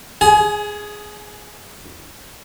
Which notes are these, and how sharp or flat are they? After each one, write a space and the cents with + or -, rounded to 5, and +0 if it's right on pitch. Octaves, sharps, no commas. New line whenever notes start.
G#4 +0 G#5 +30